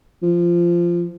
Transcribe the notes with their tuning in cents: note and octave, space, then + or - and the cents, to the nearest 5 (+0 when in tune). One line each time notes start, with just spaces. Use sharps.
F3 -15